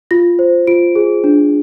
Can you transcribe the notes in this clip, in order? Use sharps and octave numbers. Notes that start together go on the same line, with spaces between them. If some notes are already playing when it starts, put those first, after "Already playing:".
F4 A#6
C5
F4 D7
G#4
D4